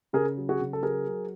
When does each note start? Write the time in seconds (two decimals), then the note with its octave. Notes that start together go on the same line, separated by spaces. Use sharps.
0.13 C#3 G#4 A#4
0.37 F#3
0.49 F#4 G#4
0.61 C#3
0.73 A4
0.83 F#3 G#4 A#4
1.06 F#3